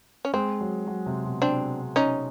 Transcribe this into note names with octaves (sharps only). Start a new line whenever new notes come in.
C#4
G#3 C4
F#3
F#3
C3
B2
C4 D4
C#4 D#4